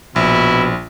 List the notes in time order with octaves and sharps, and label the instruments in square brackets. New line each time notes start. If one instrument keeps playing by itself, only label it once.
[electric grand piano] A#1 [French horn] B2 [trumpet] E4